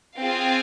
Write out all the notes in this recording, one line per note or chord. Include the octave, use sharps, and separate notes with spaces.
C4 F4 G#4 F5